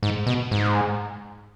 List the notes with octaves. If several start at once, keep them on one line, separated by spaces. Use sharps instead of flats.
G#2
B2
G#2